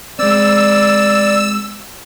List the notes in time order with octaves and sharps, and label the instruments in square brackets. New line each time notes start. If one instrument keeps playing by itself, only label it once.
[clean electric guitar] G#3 C4 [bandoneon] D5 [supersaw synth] E6